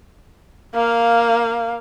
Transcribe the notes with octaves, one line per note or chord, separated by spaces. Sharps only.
A#3 F5